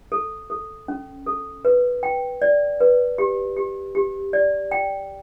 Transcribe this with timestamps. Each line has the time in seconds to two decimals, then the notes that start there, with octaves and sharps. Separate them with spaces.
0.12 A4
0.50 A4
0.88 C#4
1.27 A4
1.65 B4
2.03 G5
2.42 D5
2.80 B4
3.18 G4
3.56 G4
3.95 G4
4.33 D5
4.71 G5